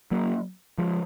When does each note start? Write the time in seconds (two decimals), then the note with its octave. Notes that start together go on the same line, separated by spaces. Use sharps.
0.11 F#3 A#3
0.78 F3 G#3